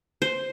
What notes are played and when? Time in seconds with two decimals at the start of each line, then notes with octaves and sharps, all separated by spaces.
0.22 C5